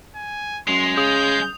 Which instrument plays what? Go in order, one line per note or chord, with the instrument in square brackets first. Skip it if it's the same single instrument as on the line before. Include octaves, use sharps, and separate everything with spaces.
[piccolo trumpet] G#5
[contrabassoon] F#2 [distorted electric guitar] G#3 [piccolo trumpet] C6 [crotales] F7
[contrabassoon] C#3 [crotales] D#6 F7 [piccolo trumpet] G6